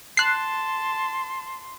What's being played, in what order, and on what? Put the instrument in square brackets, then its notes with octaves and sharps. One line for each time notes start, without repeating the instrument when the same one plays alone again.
[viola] A5 [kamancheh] C6 [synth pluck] F#6 C7